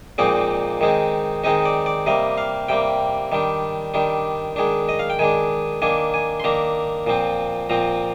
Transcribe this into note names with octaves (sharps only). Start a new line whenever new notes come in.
A#2 F3 G#3 C4 D#4 D5
D#3 G#3 C4 D#4
D#3 G#3 C4 D#4 D#5
D5
D5
C3 G3 A#3 D#5
F5
C3 G3 A#3 G5
D#3 G3 D4
D#3 G3 D4
D#3 G#3 D4
D#5
F5
G5
D#3 G#3 D4 G#5
D#3 A#3 D4 G#5
G#5
C6
D#3 A#3 D4 A#5
A#2 F3 C4
A#2 F3 C4 A#5